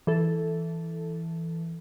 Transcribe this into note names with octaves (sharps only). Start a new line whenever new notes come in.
E3 A4